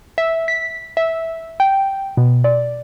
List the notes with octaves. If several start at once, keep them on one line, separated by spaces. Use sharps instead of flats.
E5
B6
E5
G5
B2
D5